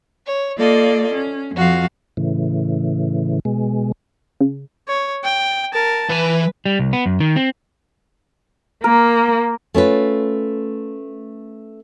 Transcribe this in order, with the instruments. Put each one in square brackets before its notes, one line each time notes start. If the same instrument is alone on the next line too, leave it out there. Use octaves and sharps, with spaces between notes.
[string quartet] C#5
A#3 F4 A4 D5 D#5
C#4
F2 F3 F#4 F5
[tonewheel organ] A2 C#3 E3
B2 G#3
[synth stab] C#3
[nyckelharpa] C#5
G5
A#4 A5
[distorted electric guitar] E3 G#5 [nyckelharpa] B4
[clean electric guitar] G3
C2
B3
F#2
D#3
C4
[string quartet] A#3 [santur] A#4
[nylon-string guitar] A3 C#4 F4 B4